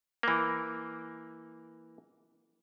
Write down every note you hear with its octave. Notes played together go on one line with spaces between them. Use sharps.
E3 A#3